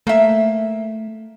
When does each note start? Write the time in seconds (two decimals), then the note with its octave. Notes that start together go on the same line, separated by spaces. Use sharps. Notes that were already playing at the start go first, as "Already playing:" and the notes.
0.07 A3 A#3 E5